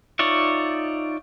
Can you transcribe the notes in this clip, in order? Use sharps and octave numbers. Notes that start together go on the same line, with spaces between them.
D#4 F4 C#5 D5 E5